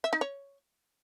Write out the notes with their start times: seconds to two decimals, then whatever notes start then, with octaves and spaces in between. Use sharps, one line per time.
0.04 E5
0.13 D#4
0.21 C#5